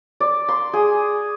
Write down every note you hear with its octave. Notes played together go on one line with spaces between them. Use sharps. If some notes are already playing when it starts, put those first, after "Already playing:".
D5
C6
G#4